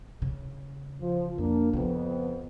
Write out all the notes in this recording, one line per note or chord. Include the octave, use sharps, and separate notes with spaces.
C#3
F3
F2 A#3 D4
F2 C#3 F3 B3